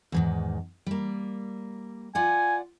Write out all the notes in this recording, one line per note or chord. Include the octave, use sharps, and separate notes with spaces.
E2 G#2 D#3
G3 A#3
F4 D5 F#5 G#5